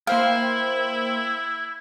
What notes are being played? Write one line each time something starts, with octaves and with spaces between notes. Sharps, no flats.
A#3 E4 C5 F5 G5